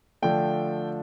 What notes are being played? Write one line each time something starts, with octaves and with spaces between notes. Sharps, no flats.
D3 F3 A3 G5